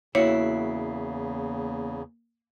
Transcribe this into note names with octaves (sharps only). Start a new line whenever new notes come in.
E2 C#3 A#3 E4 F#4 C#5 B6 C7